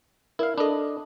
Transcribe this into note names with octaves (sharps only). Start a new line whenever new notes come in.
E4 A#4 D5 F5
D4 A4 D#5 B5